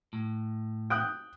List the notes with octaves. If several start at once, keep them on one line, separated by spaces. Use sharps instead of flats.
A2
G5 D#6 F#6